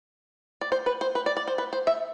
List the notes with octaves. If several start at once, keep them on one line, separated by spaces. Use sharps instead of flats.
D5
C5
B4
C5
B4
D5
D5
C5
B4
C5
E5